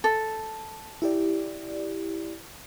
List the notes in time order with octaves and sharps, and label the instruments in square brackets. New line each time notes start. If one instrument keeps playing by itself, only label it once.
[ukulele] A4
[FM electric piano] E4 G4 D5